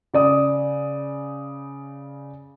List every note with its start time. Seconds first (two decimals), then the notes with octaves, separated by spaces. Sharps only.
0.14 C#3 D5 D#6